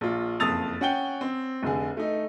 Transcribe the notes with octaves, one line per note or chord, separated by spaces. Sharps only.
A#1 F4
F#1 F2 A5 D#6 A6 F7
C#4 F#5 G5 G7
C4
F1 D3 G#4
A3 D#4